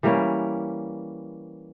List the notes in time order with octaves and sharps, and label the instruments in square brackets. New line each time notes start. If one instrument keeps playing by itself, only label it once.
[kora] E3 G3 A#3 C#4